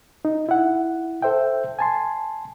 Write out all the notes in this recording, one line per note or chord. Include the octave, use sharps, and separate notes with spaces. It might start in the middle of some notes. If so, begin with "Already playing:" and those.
D#4
E4 F#5
A4 C5 E5 G5
G#5 A5 C6